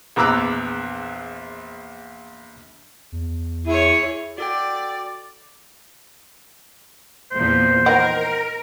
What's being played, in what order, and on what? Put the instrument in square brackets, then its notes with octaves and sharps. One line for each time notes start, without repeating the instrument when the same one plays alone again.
[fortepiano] A#1 E2 A#5 D6 E6 F#6
[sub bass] E2
[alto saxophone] E4 [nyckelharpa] G#4 C#5
[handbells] F#4 A4 G5 [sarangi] D5
[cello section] E2 A#2 F3 [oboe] C5
[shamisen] D#3 B4 F#5 [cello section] A#4